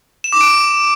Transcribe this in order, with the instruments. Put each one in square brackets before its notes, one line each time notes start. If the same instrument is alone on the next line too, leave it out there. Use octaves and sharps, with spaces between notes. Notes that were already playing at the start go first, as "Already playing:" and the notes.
[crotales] E7
D6
D7